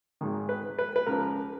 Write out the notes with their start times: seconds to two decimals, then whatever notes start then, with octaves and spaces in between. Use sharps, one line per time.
0.21 G#1 G#2 D#3
0.49 B4
0.79 B4
0.96 B4
1.07 C#2 C#3 F3 A#4